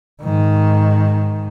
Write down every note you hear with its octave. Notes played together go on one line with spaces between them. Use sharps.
G#2 D#3